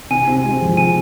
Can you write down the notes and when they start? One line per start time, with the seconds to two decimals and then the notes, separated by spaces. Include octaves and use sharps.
0.10 C3 G#5
0.27 C4
0.44 G#3
0.61 F3
0.77 C3 G#5